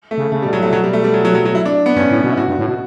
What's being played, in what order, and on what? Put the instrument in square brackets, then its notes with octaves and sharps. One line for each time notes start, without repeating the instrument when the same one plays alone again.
[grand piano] A3
[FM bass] C#3
[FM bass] C#3 [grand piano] A3
[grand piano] G3
[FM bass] B2
[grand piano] F#3
[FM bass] A2 [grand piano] A3
[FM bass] B2 [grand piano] F#3
[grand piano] G3
A3
G3
F#3
F#3
F#3
F#3
E4
D4
B3
[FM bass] G2 [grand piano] C#4
[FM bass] A2
B2
[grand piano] E4
[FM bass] A2 [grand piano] F#4
[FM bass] G2
A2
B2